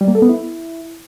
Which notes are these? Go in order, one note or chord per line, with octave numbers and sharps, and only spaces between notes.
G3
A#3
A4
B3
E4